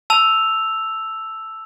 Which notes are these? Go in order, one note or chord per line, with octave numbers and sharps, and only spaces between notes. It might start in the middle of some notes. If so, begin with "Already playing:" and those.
A5 E6 F7